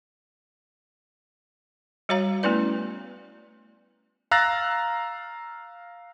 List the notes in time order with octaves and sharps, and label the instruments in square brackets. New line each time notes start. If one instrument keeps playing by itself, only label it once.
[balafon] G3 F#4 C#5 F5 A#5
A3 B3 C#4 E4 B4 D5
[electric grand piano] F5 A#5 E6 F#6 A6 A#6